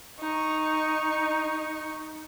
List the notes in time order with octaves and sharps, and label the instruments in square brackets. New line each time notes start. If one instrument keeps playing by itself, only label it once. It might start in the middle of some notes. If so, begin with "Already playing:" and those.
[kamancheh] D#4 C#6